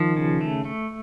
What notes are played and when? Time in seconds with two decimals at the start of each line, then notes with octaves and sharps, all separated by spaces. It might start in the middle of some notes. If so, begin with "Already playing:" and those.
Already playing: D#3 F3
0.16 C#3
0.41 A3
0.65 A3